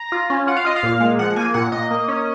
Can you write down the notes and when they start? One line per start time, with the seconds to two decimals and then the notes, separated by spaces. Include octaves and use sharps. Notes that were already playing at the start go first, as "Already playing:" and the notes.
Already playing: A#5
0.12 F4
0.30 C#4
0.47 F4 F#5
0.56 F5
0.65 F4 D#5
0.76 F5
0.83 A#2
1.00 G#3
1.19 F3 F#5
1.36 A#3 G#5
1.54 A#2 F#5
1.72 A#2 D#5
1.91 A#3
2.08 C#4